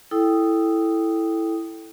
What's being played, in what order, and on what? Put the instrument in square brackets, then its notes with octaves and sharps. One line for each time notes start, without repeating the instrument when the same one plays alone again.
[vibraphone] E4 A4 G5 D#6